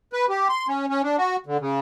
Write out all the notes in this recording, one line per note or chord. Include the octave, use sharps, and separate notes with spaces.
B4
G4
C6
C#4
C#4
D4
F#4
D3
C#3